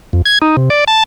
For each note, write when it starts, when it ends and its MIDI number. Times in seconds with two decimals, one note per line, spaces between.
0.13 0.22 41
0.26 0.38 92
0.42 0.56 63
0.57 0.69 48
0.70 0.84 74
0.88 1.03 81